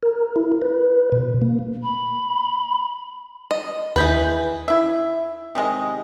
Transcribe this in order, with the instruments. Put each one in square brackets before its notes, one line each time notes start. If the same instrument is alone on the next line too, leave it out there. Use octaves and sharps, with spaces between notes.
[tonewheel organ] A#4
E4
B4
B2
A#3
[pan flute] B5
[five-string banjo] D#5
[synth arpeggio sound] D#2 G6 B6 [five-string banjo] E3 G#4 B4
[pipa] E4 E5
C3 D#3 G#3 D#5